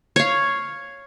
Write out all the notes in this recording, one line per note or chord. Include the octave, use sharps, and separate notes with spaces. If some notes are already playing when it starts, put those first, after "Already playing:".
C#5 F5